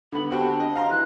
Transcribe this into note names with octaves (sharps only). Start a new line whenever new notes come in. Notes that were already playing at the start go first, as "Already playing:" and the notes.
D3 B3 B5
C4 D4 F#4 G4
D#5
F5 A#5 C6
E3 F#6